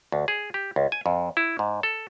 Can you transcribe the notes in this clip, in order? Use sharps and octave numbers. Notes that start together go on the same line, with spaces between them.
D2
G#4
G4
C#2
G#5
F2
E4
G#2
A4